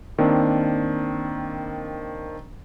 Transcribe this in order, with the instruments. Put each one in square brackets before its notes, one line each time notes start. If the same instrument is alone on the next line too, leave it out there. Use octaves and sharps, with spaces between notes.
[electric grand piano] D#3 A#3 C4 D4